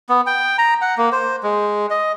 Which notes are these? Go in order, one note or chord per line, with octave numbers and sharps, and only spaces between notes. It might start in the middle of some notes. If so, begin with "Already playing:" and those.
B3
G5
A#5
F#5
A#3
C5
G#3
D#5